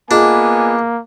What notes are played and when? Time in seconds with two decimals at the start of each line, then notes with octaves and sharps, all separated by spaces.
0.11 A#3 B3 D4 F4 G#4 D#5 G#5